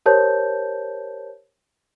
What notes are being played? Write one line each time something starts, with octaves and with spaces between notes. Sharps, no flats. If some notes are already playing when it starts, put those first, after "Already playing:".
G4 A#4 C5 C#5 A5 G6